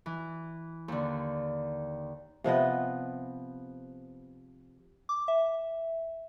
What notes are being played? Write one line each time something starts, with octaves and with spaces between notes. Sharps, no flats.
E3
D#2 D3
C3 F3 B3 D#5
D6
E5